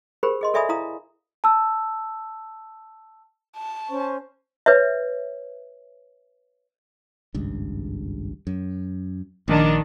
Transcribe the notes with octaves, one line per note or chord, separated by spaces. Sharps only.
G4 G#4 A#4 C5 B5
G#4 D#5 C6
A4 D5 E5 G#5 B5 D#6
E4 F5 A#5 D#6
A5 E6
A5
C#4 C5 C#6
B4 C#5 E5
G#1 C#2 G2
F#2
A#1 D#3 D4